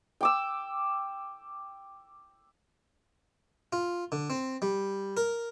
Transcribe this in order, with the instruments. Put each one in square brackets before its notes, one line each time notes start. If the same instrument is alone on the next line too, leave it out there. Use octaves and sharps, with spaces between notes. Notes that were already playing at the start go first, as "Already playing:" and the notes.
[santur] G5 D6 E6
[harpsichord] F4
D3
C4
G3
A#4